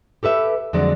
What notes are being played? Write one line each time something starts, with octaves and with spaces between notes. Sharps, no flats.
G4 A4 B4 E5
F2 D3 F#3 G#3 D5